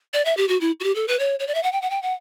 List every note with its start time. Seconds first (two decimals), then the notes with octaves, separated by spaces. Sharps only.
0.14 D5
0.25 E5
0.37 G4
0.49 F#4
0.61 E4
0.80 F#4
0.84 G4
0.95 A4
1.08 B4
1.19 C#5
1.40 C#5
1.47 D5
1.55 E5
1.63 F#5
1.73 G5
1.82 F#5
1.90 G5
2.03 F#5